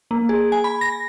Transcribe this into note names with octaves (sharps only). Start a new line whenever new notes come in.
A#3
G#4
G#5
B5
A#6